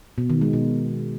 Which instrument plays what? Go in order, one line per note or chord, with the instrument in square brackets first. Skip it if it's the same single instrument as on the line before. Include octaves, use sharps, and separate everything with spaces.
[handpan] B2
D#3
G#3
B2